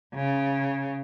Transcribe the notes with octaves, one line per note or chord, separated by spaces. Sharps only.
C#3